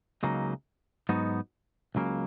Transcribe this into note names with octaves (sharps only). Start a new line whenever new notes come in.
C#2 C#3 F#3 A#3 D#4
G#2 F#3 B3 D#4 F#4
C#2 C#3 F#3 A#3